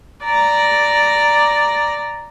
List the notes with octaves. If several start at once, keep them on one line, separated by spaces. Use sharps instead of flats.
D5 A#5